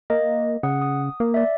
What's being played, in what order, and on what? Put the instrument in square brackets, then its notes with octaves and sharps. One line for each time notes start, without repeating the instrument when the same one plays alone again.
[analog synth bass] A#3 [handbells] D#5
[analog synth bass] C#3 [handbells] F#5 D#6
[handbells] D#6
[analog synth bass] A#3
[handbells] D5 E5